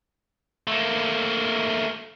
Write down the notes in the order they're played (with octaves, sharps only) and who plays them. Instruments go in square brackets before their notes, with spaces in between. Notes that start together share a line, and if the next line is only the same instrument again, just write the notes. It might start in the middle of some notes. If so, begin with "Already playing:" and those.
[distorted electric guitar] A3 A#3